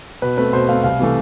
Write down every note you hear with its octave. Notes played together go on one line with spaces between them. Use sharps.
B2 B4
A3 C4 B4
B2 C5
A3 C4 F5
C2 F5
C3 E3 A3